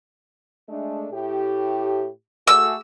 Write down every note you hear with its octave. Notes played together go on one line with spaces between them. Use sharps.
G#3 A3 D4
A2 G4
A3 F#4 G#4 E6